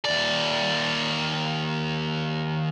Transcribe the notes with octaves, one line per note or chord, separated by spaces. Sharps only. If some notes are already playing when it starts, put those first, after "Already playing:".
D#2 D5